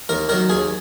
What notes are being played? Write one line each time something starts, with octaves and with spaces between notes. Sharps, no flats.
D#2 A#4
D#3 F#3 A#4
D#2 G#4